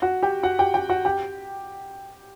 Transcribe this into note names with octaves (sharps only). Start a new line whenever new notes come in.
F#4 F#5
G4 G5
F#4 F#5
G4 G5
G4 G5
F#4 F#5
G4 G5